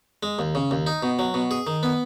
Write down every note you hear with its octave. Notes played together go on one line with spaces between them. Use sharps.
G#3
D#2
C#3
D#2
D#4
B2
F#3
B2
G#4
D#3
B3